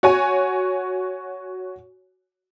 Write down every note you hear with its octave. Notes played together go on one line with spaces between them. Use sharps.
F#4 C#5 G#5